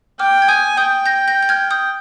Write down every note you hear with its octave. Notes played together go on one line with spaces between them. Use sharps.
G5 D6 F6
G#6
G#5 D#6 G6
G5 D#6 G6
G6 A#6
G6 A#6
G6
F6 G#6
D#6 G6